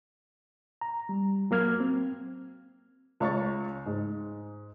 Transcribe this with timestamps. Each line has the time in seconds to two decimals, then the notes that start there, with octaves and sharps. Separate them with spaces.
0.81 A#5
1.09 G3
1.51 F#3 A#3 F6 G#6
1.80 C4
3.20 C#2 C#5 C#6 A6
3.86 G#2